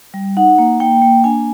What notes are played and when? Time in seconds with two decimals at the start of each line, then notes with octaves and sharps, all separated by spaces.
0.14 G3
0.37 D#4 F#5
0.58 A#3
0.80 A#3 G5
1.02 A#3
1.24 D4 G#5